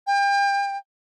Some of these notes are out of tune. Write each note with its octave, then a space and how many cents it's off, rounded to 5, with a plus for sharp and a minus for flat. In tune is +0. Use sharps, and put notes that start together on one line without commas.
G5 +35